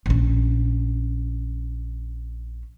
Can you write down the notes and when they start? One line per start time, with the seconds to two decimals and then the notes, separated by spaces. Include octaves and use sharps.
0.06 A#1 C#4